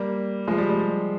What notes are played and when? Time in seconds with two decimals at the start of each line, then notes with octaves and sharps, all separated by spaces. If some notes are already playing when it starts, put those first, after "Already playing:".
Already playing: G3 A#3
0.47 F3 G#3
0.58 G3
0.69 G3
0.80 G3